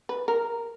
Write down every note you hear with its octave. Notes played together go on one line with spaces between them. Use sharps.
B4
A#4